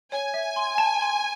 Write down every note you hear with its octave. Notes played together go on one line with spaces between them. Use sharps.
C#5 G#5
E5
C6
A5
C6